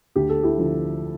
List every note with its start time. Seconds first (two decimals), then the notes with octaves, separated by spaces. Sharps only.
0.16 D2 G4
0.29 A4
0.43 E4 G4
0.58 D3 F3